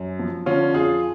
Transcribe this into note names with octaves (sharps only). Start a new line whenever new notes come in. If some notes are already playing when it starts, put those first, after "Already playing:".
Already playing: F#2
F3
D3 C#4 F4
F2 F4 G#4